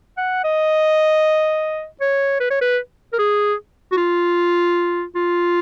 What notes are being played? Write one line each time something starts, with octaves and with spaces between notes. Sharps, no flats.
F#5
D#5
C#5
B4
C#5
B4
A#4
G#4
F#4
F4
F4